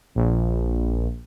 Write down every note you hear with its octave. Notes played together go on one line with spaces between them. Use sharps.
A#1